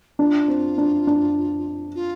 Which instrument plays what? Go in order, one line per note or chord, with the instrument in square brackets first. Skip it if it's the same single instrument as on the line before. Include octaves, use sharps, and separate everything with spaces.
[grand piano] D4 [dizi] F4
[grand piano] C4
D4
D4
[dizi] F4